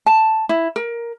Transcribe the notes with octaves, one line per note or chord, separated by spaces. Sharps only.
A5
E4
A#4